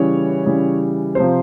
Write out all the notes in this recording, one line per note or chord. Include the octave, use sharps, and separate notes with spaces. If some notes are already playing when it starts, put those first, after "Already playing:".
Already playing: C#3 E3 G3 C#5
C#3 E3 G3
C3 F3 C5